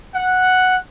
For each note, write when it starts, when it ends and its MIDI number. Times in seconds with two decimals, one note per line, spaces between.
0.15 0.77 78